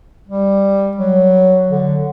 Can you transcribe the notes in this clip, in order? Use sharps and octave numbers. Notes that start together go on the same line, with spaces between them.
G3
F#3
D3